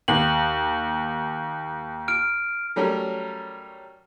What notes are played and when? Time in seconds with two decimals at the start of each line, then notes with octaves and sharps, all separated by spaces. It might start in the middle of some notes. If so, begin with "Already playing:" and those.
0.08 D#2 F#7
2.08 F6 D7
2.76 F#3 G3 A3 C#4 A#4